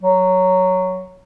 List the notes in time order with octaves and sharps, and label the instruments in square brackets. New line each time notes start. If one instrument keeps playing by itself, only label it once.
[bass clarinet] F#3